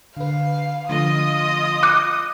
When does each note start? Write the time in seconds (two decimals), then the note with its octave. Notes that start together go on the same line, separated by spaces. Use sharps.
0.17 D3 B4 F5
0.89 D3 F3 A3 F4 D#5 D#6
1.83 D6 F#6